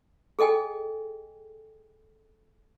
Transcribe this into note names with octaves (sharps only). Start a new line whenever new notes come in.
G#4 A4 D#5 G5 G#5